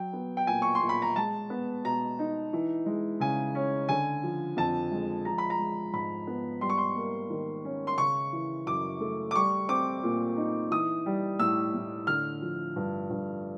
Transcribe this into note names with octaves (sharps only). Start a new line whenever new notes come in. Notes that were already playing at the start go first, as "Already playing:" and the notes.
Already playing: F#3 G5
B3
G5
A#2 G#5
C#6
C6
A#2
B5
A#5
G#3 A5
B3
B2 A#5
D#4
E3
G#3
C#3 G#5
C#4
D3 G#5
F3
F2 A5
G#3
F3 A#5
B5
A#5
G#3
G#2 B5
B3
G3 C6
C#6
C6
A#3
D#3
C#4
C6
C#3 C#6
E3
F#2 D6
A3
D6
G3 C#6
C4 D6
A#2
D#4
E3 D#6
G3
A2 E6
A2
D3 F6
F3
G2
G2